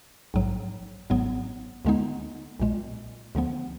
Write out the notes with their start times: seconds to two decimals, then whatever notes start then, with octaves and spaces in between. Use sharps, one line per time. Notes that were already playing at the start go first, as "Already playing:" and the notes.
0.34 A#1 G#2 F#3
1.10 G#1 G#2 F#3 B3
1.85 D2 D3 G#3 B3 D#4
2.60 B1 A#2 G#3
3.35 D2 D3 F3 B3